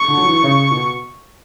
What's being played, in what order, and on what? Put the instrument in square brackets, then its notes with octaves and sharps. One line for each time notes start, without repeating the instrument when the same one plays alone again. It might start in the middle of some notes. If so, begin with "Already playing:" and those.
Already playing: [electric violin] C#6
[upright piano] D3
F#3
E3
C#3
B2